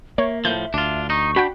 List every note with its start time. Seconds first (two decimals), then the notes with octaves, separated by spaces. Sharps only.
0.18 A#3 C#5 E5
0.45 A2 F3 E5 G6
0.74 D2 D4 F4
1.10 D#4 C#6
1.36 D4 F#4 F#5 G5 B5